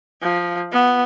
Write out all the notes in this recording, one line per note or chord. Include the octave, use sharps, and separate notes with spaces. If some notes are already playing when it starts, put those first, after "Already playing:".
F3
B3